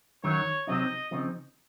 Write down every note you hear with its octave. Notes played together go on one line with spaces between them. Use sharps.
F#2 D#3 F#3 C#5
C3 F#3 C4 D#4 D#5
C#3 F3 C4 D#4